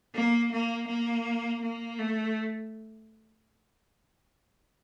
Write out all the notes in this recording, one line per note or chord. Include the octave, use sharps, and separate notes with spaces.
A#3
A#3
A#3
A#3
A3